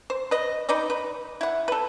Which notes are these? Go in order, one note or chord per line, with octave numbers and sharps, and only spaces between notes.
C5
B4 D#5
D#4 B4 D5 D#5
B4
E4 F#5
A4 B4